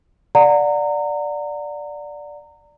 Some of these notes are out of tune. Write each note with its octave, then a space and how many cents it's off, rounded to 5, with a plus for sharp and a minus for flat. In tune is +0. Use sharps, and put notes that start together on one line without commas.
D5 +0 F#5 -30 A#5 -25